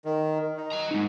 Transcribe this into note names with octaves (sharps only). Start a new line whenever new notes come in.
D#3
D#4
F#4 A#5
G#3 D#4